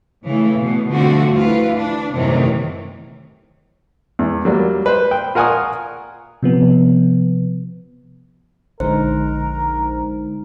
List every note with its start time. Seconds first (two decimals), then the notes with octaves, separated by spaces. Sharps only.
0.24 C#3 E3 A3
0.56 B2
0.89 D3 F3 G3 A3 C4 F#4
1.32 D2 E3 F4 B4
1.77 D4
2.12 F#2 A2 C3 D#3 E3 F#3
4.19 E2
4.45 F#3 G3 A#3
4.86 B4 C5
5.11 G5
5.35 F4 A#4 F#5 G#5 C#6 D#6
6.43 C3 F3 B3
8.80 A#1 D3 G#3 D#4 A#4 C5